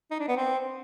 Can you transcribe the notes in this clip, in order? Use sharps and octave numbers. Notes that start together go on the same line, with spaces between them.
D#4
D4
B3
C4